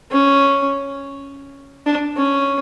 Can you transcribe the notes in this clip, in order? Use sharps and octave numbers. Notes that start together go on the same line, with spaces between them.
C#4
D4
C#4